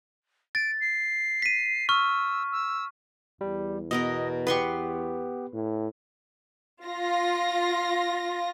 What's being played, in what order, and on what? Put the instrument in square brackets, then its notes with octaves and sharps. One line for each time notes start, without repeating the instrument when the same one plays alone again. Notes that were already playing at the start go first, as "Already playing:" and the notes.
[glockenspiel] A6 [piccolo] D7
[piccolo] C7
[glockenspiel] B6 D#7
[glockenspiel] C#6 F6 [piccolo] E6
[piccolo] E6
[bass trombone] E2 [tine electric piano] G3
[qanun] B2 B3 A#4 [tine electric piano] D#5
[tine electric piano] B3 G4 [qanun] B4 C6 C#6
[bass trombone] A2
[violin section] F4 A#6